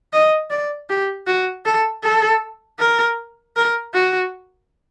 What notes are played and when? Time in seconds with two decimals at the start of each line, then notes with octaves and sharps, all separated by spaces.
0.13 D#5
0.50 D5
0.89 G4
1.27 F#4
1.65 A4
2.03 A4
2.79 A#4
3.56 A#4
3.93 F#4